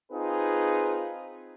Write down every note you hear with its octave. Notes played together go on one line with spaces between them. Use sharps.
C4 D#4 F4 G#4 B4